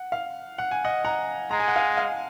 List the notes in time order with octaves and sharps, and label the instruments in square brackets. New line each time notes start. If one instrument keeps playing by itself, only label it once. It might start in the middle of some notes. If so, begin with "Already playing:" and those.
Already playing: [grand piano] F#5
F5
F#5
G#5
D#5 F#5
F#5 A#5
[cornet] G#3 [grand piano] A#5
[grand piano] G#5
F#5
F5 G#5
F5 G#5